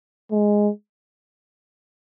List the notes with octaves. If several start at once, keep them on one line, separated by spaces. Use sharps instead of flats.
G#3